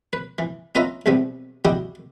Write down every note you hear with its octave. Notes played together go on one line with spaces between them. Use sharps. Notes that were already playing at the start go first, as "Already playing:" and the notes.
B4
E3
C#4 F4 B4 D#5 E5 A#5
B1 E2 C3 G3 B3
G3 E4 F#4 G4 D#5